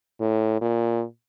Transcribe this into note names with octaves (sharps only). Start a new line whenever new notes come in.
A2
A#2